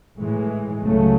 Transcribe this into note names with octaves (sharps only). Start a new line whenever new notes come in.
A2 E3 G#3
C#2 C#3 F#3 A3